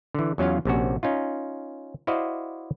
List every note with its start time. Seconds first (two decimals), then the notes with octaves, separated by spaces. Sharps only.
0.14 D3 E3
0.38 E2 F#3 C#4 F4 F5
0.65 A#1 C3 C#4 F#4
1.03 C#4 D#4 F4
2.07 E4 F#4 C5 D5 D#5 F5